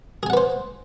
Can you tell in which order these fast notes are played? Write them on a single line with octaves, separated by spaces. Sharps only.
G#4 G#5 F#5 B4 C5